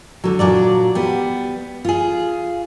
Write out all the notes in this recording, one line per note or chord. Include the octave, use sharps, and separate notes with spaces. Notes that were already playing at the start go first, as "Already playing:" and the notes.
D3 F#3
A#2 F#3 D4 D5
G3 B3
F4 G#4